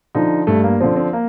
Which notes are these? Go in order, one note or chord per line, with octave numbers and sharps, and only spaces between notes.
D3 F3 D#4
G2 A3
A#3
D3 F3 C4
C4
A#3